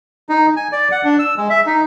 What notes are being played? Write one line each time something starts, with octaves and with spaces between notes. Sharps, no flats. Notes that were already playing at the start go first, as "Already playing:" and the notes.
D#4
G#5
D5
F#5
D4
E6
G#3
E5
D#4